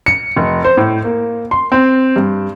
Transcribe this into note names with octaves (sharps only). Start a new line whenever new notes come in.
C#7
F1
C5
A2
A#3
C6
C4
G2